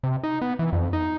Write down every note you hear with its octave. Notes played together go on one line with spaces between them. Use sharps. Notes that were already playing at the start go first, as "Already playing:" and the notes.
C3
D#4
B3
E3
F2
D#4